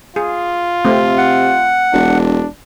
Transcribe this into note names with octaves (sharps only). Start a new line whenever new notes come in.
F4 G#4
C3 A3 C4
F#5
E1 D4